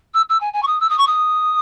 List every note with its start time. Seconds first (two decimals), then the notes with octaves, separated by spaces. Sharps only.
0.14 E6
0.29 E6
0.40 G#5
0.53 G#5
0.62 C#6
0.67 D#6
0.80 E6
0.89 D#6
0.98 C#6
1.07 D#6